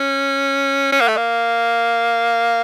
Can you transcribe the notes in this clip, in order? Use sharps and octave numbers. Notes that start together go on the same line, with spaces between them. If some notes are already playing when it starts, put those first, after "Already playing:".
Already playing: C#4
C#4
A#3
A3
A#3